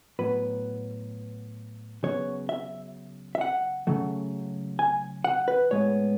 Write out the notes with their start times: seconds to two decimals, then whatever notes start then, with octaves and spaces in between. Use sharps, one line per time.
0.19 A2 F#3 B3 B4
2.03 C#3 F#3 B3 C#5
2.49 E5
3.35 E5
3.41 F#5
3.87 C#3 F#3 A3
4.79 G#5
5.24 F#5
5.48 B4
5.71 A2 G#3 B3 C#5